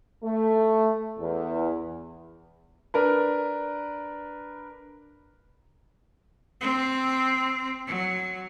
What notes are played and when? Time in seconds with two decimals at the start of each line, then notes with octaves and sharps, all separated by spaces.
0.24 A3
1.18 E2
2.94 D4 A#4 B4
6.61 C4
7.87 F#3